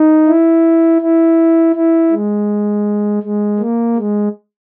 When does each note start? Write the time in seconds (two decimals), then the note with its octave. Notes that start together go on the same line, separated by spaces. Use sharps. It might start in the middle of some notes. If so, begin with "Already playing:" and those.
Already playing: D#4
0.28 E4
1.02 E4
1.76 E4
2.12 G#3
3.23 G#3
3.59 A#3
3.97 G#3